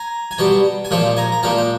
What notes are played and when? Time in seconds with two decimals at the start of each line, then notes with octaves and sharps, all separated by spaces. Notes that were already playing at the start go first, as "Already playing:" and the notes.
Already playing: G#5 A#5
0.31 G#5
0.38 B2 G3 G5 A5
0.85 G#5
0.91 A#2 F3 G#3 G5 A5
1.17 G#5 A#5
1.32 A#5
1.43 A#2 F3 G#3 G5 A5
1.58 G5